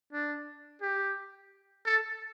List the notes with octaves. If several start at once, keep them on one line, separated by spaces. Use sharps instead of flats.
D4
G4
A4